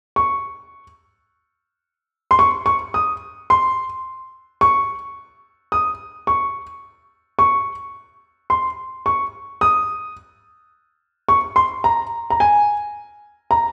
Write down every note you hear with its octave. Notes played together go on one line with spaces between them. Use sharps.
C#6
C6
C#6
C#6
D#6
C6
C#6
D#6
C#6
C#6
C6
C#6
D#6
C#6
C6
A#5
A#5
G#5
A#5